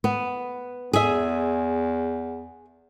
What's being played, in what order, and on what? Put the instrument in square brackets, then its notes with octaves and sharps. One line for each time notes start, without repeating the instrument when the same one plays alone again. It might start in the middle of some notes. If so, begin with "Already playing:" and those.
[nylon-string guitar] B3
[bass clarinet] E2 [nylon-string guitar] G#4 E5